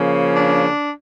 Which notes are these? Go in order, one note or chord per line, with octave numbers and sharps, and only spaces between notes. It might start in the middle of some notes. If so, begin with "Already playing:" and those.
Already playing: C#3 F3 A#3 C#4
D4